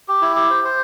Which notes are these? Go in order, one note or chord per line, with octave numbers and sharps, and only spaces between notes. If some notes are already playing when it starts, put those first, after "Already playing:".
G4
E4
G4
C5
C5